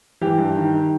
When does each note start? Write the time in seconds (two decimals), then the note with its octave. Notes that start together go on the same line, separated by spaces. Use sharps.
0.21 E3 G4
0.38 G2
0.56 D#3
0.74 D#3